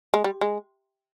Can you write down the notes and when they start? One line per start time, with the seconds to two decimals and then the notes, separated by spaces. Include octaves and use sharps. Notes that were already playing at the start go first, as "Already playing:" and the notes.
0.14 G#3
0.24 G3
0.41 G#3